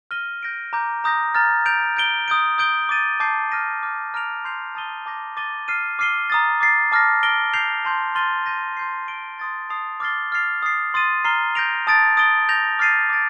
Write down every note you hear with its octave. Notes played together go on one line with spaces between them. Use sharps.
F6 A#6 D#7 G7
G6 A#6 D7
A#5 D6 G6
A#5 D#6 G6 A#6
A#5 F6 A6
G6 D7 F7
G6 D7 G7
D#6 G6 D7
D#6 G6 D7 G7
D6 A6 D#7
A5 D6 G6 C7
F6 A#6 D#7
D6 F6 A6
A#5 F6 A#6 D7 F7
C6 G6 C7 F7
A5 D#6 A6 D#7 G7
A5 D6 G6 A#6
D6 A6 D#7 G7
F6 C7 D#7
D6 F6 C7 D#7 G7
A#5 D#6 A6
D6 A6 C7
A5 D6 F6 A#6
F6 A#6 D7 G7
G6 C7 F7
A5 C6 G6
C6 F6 A6 D#7 G7
G6 A#6 D#7
C6 G6 C7
C6 G6 D7 G7
C6 D#6 A6
A5 D#6 A6 C7 F7
D6 F6 A6 C7 G7
F6 A6 C7 F7
D#6 A6 C7
C6 D#6 A6 D#7
A#5 F6 C7 G7
G6 A#6 D7 F7
A5 D#6 A6 D7
D#6 A6 D7 G7
G6 A#6 F7
D6 F6 A6 C7 D#7
D6 A6 D7